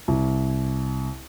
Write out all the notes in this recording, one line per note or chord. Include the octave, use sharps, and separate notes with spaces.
C2